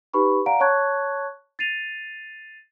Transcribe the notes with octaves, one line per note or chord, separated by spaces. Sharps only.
D#4 G4 B4 B5 C#6
D5 F5 F#5 A#5 D7
C#5 A5 C#6 F#6 G#6
A6 C7 D#7 F7